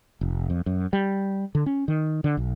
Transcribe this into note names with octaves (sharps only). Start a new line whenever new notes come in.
F1
F2
F#2
G3
D3
C#4
D#3
D3
B1